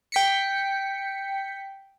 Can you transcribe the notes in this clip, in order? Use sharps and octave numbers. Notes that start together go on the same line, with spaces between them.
G5 B6 C#7